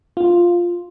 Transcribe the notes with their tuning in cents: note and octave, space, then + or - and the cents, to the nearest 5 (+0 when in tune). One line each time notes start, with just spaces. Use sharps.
F4 +0